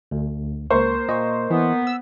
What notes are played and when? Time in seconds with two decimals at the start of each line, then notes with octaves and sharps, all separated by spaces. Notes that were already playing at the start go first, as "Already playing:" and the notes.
0.11 D2
0.70 C#2 A#3 C5 C#6
1.09 A#2 D#5 C#6
1.50 E3 B3
1.87 E6